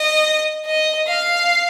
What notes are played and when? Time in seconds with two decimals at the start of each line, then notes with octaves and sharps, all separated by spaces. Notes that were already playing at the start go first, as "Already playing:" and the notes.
Already playing: D#5
0.66 D#5
1.08 F5